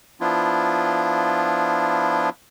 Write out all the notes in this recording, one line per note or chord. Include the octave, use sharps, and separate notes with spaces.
F3 B3 D4 E4 F4